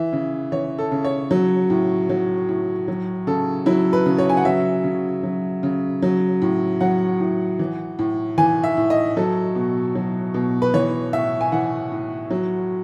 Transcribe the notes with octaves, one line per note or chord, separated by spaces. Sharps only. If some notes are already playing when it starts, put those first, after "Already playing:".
Already playing: E3 E5
C#3
E3 C#5
A4
C#3
C#5
F#3
A2
F#3
A2
F#3
C#3 A4
F#3 E4
B4
C#3
C#5
G#5
F#5
F#3 E5
C#3
F#3
C#3
F#3
A2
F#3 F#5
A2
E3
A2
E3 G#5
E5
A2
D#5
F#3 A4
B2
F#3
B2
B4
E3 C#5
A2 E5
G#5
E3 F#5
A2
F#3